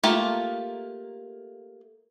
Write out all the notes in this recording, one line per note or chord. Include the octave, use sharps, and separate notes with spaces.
A3 A#3 F4 G4